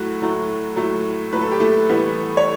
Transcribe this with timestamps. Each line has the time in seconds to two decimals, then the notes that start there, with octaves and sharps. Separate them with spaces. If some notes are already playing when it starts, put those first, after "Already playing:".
Already playing: A2 F#3 A3 F#4
0.20 A2 F#3 A3
0.76 A2 F#3 A3
1.33 A2 F#3 A3 B4
1.41 A4
1.51 G4
1.60 A3 A4
1.89 A2 E3 G3 B3
2.37 C#5